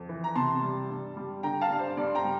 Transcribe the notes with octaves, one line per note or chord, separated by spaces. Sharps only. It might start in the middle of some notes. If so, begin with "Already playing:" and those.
Already playing: F2
E3
A#5
C3 A5 C6
G3
G2
G3
D3 G5 A#5
F5 A5
G2
C5
G2 D5
C6
G5 A#5
G3